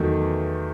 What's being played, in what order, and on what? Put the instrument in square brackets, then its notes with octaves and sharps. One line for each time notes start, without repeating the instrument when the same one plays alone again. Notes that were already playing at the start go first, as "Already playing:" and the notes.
Already playing: [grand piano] E2 D#3 F#3 A3